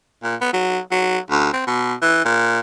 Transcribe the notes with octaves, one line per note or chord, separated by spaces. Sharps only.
A#2
B3
F#3
F#3
D2
C4
B2
E3
A#2